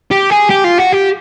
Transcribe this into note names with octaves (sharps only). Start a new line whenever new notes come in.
G4
G#4
G4
F4
F#4
G4